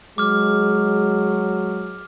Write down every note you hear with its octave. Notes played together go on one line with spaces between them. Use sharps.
F#3 G#3 D6 F6